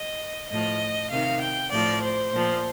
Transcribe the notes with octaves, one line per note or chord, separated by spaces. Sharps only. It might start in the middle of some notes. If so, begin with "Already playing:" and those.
Already playing: D#5
A2 F3 D#5
C3 D#3 F5
G5
A2 F3 D5
C5
A#2 F3